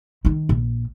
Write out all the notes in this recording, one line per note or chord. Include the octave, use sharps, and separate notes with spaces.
D#3 D#4
A#1